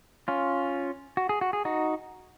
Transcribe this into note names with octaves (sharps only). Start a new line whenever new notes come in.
C#4 F4
F#4
G#4
F#4
G#4
D#4 F#4